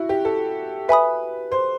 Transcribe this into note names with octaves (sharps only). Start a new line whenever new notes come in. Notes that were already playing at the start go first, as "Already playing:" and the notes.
Already playing: E4 F#4
G4
A4
B4 E5 G#5 B5 D#6
C5